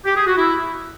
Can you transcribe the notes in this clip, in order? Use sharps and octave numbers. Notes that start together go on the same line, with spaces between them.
G4
G#4
F#4
E4